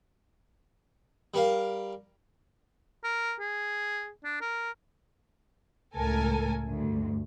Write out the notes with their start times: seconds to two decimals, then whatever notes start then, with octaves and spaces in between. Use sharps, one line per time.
1.34 G3 A#4 F5
3.04 A#4
3.40 G#4
4.24 D4
4.41 A#4
5.96 C#2 A2 A4 A#4 G#5
6.69 D2 G2